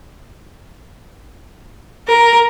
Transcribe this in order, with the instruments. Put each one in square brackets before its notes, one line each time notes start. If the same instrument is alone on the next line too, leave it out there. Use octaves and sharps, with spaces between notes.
[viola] A#4